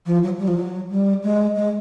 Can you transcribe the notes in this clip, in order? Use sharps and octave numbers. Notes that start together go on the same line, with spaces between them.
F3
F#3
G3
F3
F#3
G3
G#3
G#3